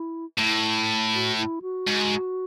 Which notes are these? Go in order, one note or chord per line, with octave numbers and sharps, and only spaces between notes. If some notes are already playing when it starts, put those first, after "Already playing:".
Already playing: E4
A2 E4
F#4
E4
F#4
G#2